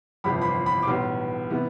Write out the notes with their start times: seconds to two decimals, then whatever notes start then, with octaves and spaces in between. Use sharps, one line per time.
0.24 G1 F2 C3 E3 B5
0.41 B5
0.45 C6
0.66 B5
0.82 D6
0.87 B1 A2 E3 G3 B3 C6
1.50 C3 E3 B3